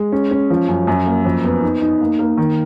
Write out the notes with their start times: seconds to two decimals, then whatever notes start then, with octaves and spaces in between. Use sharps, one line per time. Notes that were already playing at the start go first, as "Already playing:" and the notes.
Already playing: G#3
0.12 C#4
0.31 C#4
0.50 F3
0.68 F#2
0.87 F#2
1.06 A#3
1.25 F2
1.44 B3
1.62 D#4
1.82 D#4
2.01 A#3
2.19 A#3
2.37 D#3